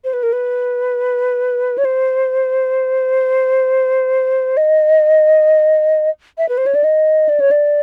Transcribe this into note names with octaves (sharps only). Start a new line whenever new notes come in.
C5
B4
A#4
B4
C#5
C5
D#5
E5
B4
C5
C#5
D5
D#5
D5
C#5
D5